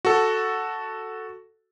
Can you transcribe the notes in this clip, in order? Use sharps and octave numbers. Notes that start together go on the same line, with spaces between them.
F#4 A4